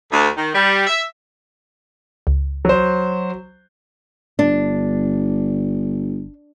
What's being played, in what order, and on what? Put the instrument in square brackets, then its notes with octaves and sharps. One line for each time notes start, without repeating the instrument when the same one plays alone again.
[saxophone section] D2
D#3
G3
E5
[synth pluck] C#2
[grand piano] F#3 C5
[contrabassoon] G1 [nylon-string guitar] D4